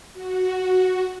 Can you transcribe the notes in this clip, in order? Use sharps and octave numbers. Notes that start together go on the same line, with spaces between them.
F#4